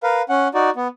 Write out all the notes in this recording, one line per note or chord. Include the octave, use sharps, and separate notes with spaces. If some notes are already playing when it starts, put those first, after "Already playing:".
A#4 B4 F5
C#4 F#5
D#4 F#4 D5
B3